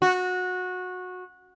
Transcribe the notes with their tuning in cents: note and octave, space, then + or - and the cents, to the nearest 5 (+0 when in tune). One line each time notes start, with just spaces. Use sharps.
F#4 -20